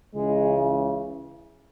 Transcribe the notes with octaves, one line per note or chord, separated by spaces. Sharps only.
C#2 C#3 E3 G#3